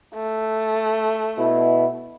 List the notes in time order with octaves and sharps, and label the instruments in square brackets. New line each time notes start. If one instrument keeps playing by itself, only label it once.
[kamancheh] A3
[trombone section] B2 E4